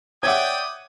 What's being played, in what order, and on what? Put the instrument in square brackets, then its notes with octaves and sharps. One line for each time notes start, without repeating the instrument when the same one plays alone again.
[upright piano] C#5 E5 D6 [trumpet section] D5 G5 [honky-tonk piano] F#5 G#6 [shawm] D#6